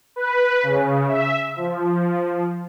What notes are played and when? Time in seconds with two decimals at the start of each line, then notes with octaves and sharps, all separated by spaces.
0.16 B4
0.63 C#3
1.08 E5
1.56 F3